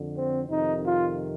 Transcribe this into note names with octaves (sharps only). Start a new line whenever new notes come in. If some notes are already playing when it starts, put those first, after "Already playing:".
Already playing: F2 D3
C4
F2 C3 D#3 D#4
F4